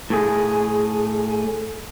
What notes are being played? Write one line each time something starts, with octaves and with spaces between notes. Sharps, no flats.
A2 G#4